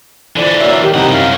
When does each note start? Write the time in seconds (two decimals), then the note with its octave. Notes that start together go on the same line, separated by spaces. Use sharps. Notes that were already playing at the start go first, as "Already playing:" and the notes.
0.36 F2 D3 E3 D5
0.60 F#3 A#3 E5
0.83 D#3 G4
0.94 C2 C#3 D#4 G4 A#4 F#5
1.11 F#2 F5